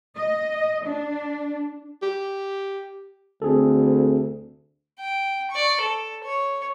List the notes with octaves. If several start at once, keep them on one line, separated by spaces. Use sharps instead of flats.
D#5
D4
G4
D2 C4 G#4 A4
G5
D5 C#6
A4
C#5